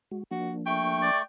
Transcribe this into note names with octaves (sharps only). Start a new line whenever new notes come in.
G#3 F#4
F3 A#3 D4 F#4
A3 G5 C#6
D5